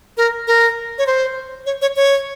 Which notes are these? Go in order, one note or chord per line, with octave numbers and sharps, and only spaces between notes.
A#4
A#4
C#5
C5
C#5
C#5
C#5